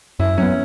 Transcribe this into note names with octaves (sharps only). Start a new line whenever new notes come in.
F#2 E4
F#3 B3 C#4